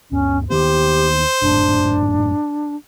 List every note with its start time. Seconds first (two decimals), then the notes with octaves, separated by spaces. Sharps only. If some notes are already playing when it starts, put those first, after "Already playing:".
0.12 D2 G2 C#4
0.50 D#2 D#3 B3 G4 C5
1.42 G#1 F#2 A2 D4